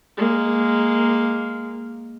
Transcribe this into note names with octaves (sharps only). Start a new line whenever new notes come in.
G#3 A#3